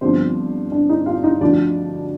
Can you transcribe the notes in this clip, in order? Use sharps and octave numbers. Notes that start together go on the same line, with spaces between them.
G1 G2 D3 F3 C4 C5
D4 D5
D#4 D#5
F4 F5
D#4 D#5
D2 D3 F3 D4 D5